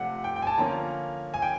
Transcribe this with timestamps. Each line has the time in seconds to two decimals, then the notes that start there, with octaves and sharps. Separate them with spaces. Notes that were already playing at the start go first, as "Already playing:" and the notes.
Already playing: C3 F3 A3 D4 F#5
0.24 G5
0.36 G5
0.42 G#5
0.47 A5
0.58 D3 F3 A#3 C#4 A#5
1.34 G#5
1.42 G5